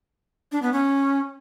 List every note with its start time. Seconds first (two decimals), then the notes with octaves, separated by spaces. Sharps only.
0.52 D4
0.62 B3
0.73 C#4